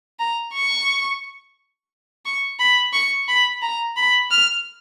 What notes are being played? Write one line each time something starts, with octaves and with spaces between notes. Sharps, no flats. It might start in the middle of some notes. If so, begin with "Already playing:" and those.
A#5
C#6
C#6
B5
C#6
B5
A#5
B5
F6